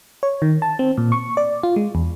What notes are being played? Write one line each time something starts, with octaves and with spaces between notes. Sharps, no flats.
C#5
D#3
A5
C4
A#2
C#6
D5
F4
G#3
E2